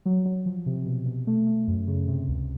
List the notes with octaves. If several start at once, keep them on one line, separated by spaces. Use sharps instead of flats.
F#3
F#3
F3
C3
B2
B2
A3
A3
F#2
C#3
C3
C#2